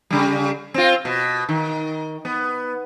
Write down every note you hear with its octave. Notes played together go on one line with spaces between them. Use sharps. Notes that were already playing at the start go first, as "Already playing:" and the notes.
C#3 G3
C4 F4
B2
D#3
B3